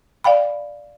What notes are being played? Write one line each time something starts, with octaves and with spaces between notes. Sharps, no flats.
D5 F5 G5 B5